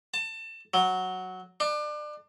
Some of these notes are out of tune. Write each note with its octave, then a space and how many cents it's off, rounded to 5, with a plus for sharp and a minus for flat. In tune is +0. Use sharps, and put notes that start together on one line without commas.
A5 +25
F#3 +0
D4 +30